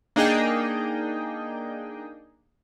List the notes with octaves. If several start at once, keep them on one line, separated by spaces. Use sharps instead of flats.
A#3 D4 D#4 G#4 D#5 G5